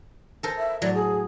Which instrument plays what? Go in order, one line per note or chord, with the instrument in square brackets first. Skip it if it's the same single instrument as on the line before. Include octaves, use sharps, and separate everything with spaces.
[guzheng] A4 A#4 C5
[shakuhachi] E5
[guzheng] A2 F#3 [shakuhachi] D5
[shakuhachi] G#4